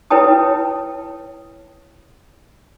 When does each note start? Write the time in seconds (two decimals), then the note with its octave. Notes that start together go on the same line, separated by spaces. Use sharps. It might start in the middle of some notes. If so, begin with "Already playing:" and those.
0.10 E4 B4 C#5 G5 A5 D#6